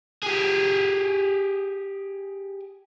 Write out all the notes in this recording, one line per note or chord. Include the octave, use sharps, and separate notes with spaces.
G4 G#4